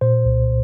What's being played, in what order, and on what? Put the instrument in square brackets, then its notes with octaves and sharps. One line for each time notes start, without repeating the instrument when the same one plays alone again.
[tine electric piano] A#2 C5
C2